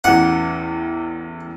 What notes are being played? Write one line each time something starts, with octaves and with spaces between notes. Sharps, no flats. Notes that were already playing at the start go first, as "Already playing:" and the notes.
A1 E2 F#5